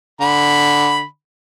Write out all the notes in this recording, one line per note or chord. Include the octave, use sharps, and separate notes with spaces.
D3 B5